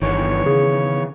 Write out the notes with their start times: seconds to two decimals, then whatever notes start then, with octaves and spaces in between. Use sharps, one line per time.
0.02 G1 D#3 E3 B3 C#5
0.46 C#3 G#4